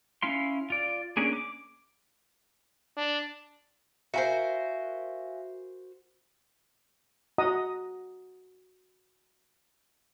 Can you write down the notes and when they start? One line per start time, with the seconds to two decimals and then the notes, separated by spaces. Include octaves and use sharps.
0.22 C#4 E4 F5 C6
0.70 F4 D5
1.17 A#3 C#4 D4 G#4
1.33 D6
2.97 D4
4.14 F#4 A#4 C5 E5 F5 G#5
7.38 F#4 D#5 F#5 A#5 D#6